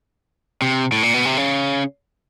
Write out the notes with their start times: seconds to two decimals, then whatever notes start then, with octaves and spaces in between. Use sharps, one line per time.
0.62 C3
0.92 A2
1.03 A#2
1.14 B2
1.25 C3
1.37 C#3